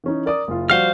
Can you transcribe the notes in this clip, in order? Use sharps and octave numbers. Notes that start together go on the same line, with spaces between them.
E3 C#4 D#4
A#4 D5 D#6
F#1 F4
F3 G3 F#4 C5 F5 F6